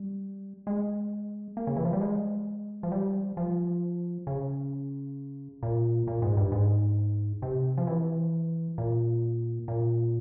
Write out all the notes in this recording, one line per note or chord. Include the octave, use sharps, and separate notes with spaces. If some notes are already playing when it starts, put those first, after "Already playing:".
Already playing: G3
G#3
A#3
C#3
E3
F3
G3
G#3
F3
G3
F3
C#3
A#2
A#2
G#2
G2
G#2
C3
F3
E3
A#2
A#2